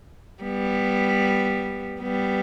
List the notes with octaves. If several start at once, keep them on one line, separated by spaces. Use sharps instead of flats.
G3 B3
G3 B3